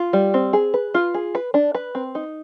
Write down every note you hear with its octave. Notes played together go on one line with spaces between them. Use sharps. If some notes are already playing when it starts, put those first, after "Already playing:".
Already playing: F4
G3
C4
G#4
B4
F4
G#4
B4
D4
B4
C4
D#4